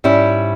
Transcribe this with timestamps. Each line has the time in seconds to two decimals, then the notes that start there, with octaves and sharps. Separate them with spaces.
0.04 G#2 G3 C#4 E4